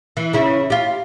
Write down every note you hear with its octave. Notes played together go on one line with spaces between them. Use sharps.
E3
C#3 E4
F4 G4